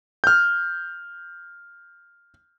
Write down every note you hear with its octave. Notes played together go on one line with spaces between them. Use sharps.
F6 G6